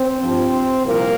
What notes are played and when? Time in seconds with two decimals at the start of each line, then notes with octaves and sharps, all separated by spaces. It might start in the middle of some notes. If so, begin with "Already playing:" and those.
Already playing: C4
0.22 G2 F3
0.83 C2 A#2 F3 A#3